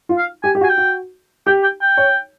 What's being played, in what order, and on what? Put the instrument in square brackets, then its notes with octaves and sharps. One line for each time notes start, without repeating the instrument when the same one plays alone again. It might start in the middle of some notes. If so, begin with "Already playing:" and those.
[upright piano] F4
[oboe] F5
[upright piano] G4 [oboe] G#5
[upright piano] G4
F#4
[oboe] G#5
G5
[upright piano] F#4
[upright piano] G4 [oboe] G5
[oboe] G5
G5
[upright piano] C#5